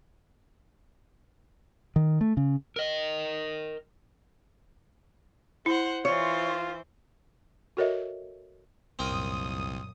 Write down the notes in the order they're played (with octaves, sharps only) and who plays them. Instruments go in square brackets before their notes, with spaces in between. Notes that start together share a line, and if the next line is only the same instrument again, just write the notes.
[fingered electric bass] D#3
A3
C#3
[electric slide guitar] A#4 D#5
[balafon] E4 [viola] C5 F#5
[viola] E3 C5 [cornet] F4 [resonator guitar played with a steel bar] C#5
[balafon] F#4 A4 A#4 C#5 D#5 E5
[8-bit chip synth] C2 [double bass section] F#2 A#2 [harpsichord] C4 A#4 [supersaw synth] D#6